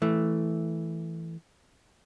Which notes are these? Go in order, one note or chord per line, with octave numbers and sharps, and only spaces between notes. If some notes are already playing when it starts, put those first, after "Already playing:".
E3 A3